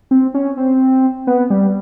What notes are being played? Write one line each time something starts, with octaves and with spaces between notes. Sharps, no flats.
C4
C#4
C4
B3
G3